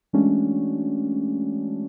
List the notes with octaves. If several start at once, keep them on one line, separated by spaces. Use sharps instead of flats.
E3 G#3 A3 C#4 D4 F#4